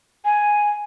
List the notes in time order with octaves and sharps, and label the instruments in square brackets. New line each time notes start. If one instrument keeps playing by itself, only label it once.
[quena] G#5